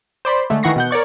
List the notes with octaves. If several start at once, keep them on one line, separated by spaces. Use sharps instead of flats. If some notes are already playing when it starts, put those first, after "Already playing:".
C5 D5 B5 C6
D3 G#3 A3
D#3 E3 F#5 C#6 A#6 C7
B2 F#5 G6
A#4 C#5 D5 C#6